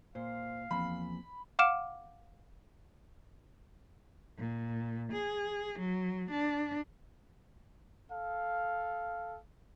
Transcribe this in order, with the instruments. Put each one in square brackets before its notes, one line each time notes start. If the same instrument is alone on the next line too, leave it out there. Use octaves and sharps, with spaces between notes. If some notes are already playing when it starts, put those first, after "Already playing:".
[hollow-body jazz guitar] A#2 [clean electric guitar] C5 [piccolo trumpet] F5
[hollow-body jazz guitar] E2 [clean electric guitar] F3 A#3 C4 [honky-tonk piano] B5
[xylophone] F5 F#5 D6 F6 D7 E7
[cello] A#2
G#4
F#3
D4
[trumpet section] A4 F5